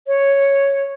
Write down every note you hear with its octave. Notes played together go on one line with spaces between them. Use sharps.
C#5